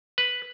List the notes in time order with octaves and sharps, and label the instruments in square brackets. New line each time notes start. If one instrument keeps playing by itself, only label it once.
[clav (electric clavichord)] B4